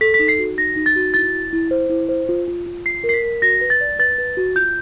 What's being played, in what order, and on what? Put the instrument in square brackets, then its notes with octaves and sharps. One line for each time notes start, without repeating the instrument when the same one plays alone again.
[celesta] A4 B6
B6
D#4
C7
F#4
D#4 A#6
D#4
A6
F#4
E4 A6
E4
E4
C5
E4
C5
F4
F4
F4
F4 C7
A#4
C7
B6
A#4
F#4 A#6
B4
A6
D5
B4 A6
B4
F#4
F4 G6